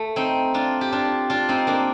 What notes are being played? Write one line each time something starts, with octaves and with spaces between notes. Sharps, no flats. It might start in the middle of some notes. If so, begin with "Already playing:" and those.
Already playing: A3
C4 D#4
D4 F4
G4
D4 F4
D4 F4
C4 D#4
A#3 D4